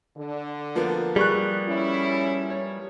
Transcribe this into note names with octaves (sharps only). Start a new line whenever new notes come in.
D3
F3 A#3 B3
G3 G#4 C#6 F#6
C#4 E4
C#5